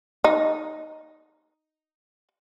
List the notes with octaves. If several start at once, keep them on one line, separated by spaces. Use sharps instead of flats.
D#4